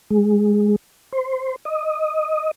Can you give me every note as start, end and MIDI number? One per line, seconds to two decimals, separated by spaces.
0.10 0.76 56
1.12 1.56 72
1.65 2.51 75